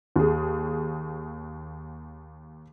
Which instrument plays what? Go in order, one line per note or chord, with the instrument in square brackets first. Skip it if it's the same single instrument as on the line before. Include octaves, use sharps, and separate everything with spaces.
[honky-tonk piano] D#2 G#4